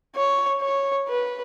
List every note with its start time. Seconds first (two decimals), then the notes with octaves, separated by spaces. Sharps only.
0.16 C#5
0.62 C#5
1.09 B4